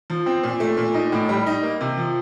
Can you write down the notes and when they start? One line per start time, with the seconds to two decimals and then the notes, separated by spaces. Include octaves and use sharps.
0.10 F3
0.26 C4
0.43 A#2
0.60 A3
0.77 A#2
0.94 D#4
1.12 A2
1.29 G3
1.46 D#4
1.63 A#3
1.81 C3
1.97 F3